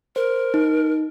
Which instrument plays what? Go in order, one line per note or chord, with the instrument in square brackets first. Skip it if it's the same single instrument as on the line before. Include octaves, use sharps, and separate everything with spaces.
[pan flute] A#4 [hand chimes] C5
[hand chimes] D#4